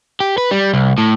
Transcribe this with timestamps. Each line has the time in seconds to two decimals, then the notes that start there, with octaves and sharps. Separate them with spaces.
0.20 G4
0.38 B4
0.51 G3
0.74 C2
0.98 A2